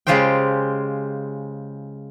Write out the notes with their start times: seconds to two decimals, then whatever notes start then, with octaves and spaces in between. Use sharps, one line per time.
0.07 C#3 G#3 F4 G4 C5 G5